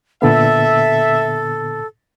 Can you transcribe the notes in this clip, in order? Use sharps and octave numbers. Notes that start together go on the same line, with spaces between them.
A#2 D3 B3 A4 E5